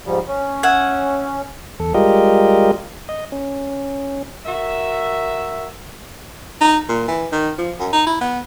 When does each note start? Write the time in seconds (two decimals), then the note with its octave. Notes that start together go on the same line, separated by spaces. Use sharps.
0.06 G#2 F3 G3
0.27 C#4
0.63 E5 F#5 G#5
1.80 E2 A4
1.94 G3 G#3 F4 G4 A#4 D#5
3.09 D#5
3.32 C#4
4.45 F#4 A#4 E5
6.61 D#4
6.89 A#2
7.08 E3
7.32 D#3
7.58 F3
7.80 F#2
7.93 D#4
8.07 E4
8.21 B3